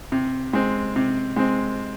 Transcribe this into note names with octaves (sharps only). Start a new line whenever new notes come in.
C3
G#3 C4
C3
G#3 C4